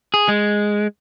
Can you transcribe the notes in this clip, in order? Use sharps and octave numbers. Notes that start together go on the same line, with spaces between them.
G#4
G#3